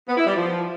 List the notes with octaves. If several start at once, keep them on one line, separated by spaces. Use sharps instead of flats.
B3
E4
G3
F3